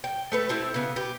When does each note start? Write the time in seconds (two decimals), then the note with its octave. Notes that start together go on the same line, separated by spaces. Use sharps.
0.04 G5
0.32 A3 A4 B4
0.49 A3 C4 E4
0.74 C#3 B3
0.96 G4 B4